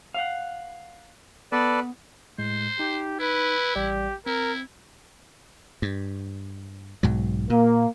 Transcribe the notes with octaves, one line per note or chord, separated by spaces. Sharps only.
F5 F#5
B3 A4 B4 D5
A2 G#3 C5
D#4 G4
E4 B4
A1 G3 G4 D5
C4 E4 A#4
G2
B1 G#2 F#3
A#2 A#3